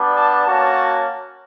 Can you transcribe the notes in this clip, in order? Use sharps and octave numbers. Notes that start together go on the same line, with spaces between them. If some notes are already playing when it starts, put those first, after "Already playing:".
Already playing: G3 B3 D4
A5
A#3 C#4 F#4 A5